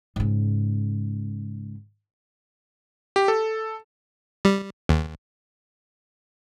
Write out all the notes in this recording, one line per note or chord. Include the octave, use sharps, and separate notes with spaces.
G#2 C#3
G4
A4
G3
D#2